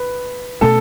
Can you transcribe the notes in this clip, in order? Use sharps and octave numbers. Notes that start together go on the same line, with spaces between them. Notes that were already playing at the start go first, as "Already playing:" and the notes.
Already playing: B4
B2 A3 C#4 A4